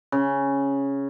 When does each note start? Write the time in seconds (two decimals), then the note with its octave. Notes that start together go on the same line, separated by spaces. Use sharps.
0.12 C#3